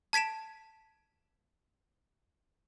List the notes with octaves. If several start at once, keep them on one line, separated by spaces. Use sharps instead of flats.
A5 G#6 B6 D7 E7